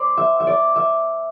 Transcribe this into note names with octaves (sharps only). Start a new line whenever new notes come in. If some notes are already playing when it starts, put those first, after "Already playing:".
Already playing: C5 D5
E5
E5
D5
E5